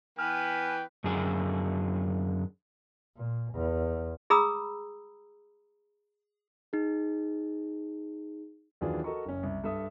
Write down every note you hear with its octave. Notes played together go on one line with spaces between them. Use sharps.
E3 B3 B4 G5 G#5 F6
F#2 D3 G#4
A#2
E2
G#4 A#5 B5 D#6 E6
D#4 G#4
D#2 E3 F#3 D4 F4 G#4
F#4 A4 A#4 D#5 A#5 C#6
F#1 C#4
C2
G2 A4 E5 D#6